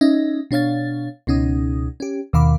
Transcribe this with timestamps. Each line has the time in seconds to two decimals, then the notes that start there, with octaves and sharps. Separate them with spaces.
0.01 C#4 D#4 D#5 E5
0.51 B2 D4 C#5 F5 A6
1.27 C#2 B2 C#4 D#4 D#6
2.00 C#4 G4
2.33 D#2 B2 D#3 F5 B5 D6